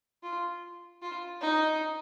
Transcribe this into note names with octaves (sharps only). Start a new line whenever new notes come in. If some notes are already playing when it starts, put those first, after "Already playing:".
F4
F4
D#4